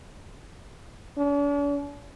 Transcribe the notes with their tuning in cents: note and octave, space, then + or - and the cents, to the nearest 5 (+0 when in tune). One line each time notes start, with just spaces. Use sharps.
D4 -45